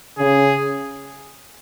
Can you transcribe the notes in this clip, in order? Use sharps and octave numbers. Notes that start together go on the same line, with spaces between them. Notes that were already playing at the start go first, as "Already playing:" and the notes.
C#3 G#4